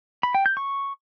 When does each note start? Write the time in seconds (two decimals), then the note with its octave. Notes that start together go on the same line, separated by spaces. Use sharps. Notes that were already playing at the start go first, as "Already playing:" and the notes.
0.23 B5
0.35 G5
0.46 G6
0.57 C#6